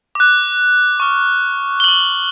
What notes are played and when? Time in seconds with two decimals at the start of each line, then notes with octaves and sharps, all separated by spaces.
0.15 D6 F#6
1.00 C#6 F6
1.80 G7
1.84 C#6 F#6 F#7